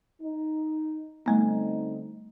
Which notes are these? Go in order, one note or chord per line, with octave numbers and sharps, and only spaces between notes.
D#4
D3 G3 A3 B3 C4 D#4